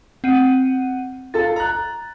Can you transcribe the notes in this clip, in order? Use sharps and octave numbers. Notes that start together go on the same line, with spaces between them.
C4 F#5 D#7
F4 A4 A5 A6
A#5 F#6